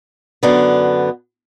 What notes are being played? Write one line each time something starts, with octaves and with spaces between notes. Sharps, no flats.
F#2 D3 B3